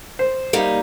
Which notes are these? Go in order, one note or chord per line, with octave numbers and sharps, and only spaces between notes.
C5
G3 A#3 D#4